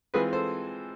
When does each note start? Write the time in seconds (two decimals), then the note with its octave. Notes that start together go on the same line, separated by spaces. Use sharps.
0.14 E3 G#3 C4 F4 G#4 B4
0.33 A4 C5